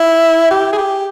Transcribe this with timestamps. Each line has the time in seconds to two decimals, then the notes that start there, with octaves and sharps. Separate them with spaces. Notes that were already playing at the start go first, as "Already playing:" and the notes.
Already playing: E4
0.51 G4
0.73 G#4
0.78 G4